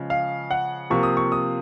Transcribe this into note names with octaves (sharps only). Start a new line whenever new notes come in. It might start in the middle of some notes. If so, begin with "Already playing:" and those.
Already playing: C#3 F3 G#3
F5
F#5
C3 F3 A#3 C#6
D#6
C#6
D#6